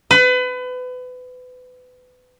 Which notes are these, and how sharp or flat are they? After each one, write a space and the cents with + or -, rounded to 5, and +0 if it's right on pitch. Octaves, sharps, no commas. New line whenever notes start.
B4 +30